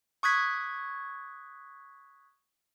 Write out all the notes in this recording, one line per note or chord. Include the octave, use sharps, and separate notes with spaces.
C#6 D#6 F#6 G#6 B6